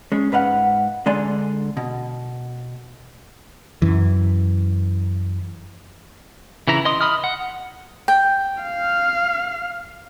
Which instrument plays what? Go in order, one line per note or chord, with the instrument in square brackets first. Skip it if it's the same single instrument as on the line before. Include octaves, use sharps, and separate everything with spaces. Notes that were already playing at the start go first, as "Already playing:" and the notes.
[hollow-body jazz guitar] G#3 C#4
G#2 B4 F5 F#5
D3 G#3 D4 D5 G#5 C6
B2
[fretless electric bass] F#2 E3
[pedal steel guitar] C#3 E3 E4 A#5
D#5 C6 D#6
D#5 B5 D#6 F6
F#5
[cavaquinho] G5
[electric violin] F5